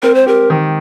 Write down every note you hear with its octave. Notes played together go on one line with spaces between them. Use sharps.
C4 A#4
C5
G4 A#4
D#3